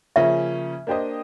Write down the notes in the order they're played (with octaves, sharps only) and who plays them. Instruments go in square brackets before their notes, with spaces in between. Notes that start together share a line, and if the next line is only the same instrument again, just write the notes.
[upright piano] C#3 F3 A#3 C#4 [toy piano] E5
[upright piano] A#3 D4 G4 C5 D#5